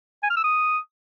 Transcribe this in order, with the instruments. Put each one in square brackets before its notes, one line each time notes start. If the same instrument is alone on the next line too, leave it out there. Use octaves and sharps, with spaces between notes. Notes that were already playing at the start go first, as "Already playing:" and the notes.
[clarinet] G#5
F6
E6
D#6